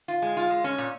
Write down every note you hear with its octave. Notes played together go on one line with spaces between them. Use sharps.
F4
G#3
F4
G#3
C#4
A#2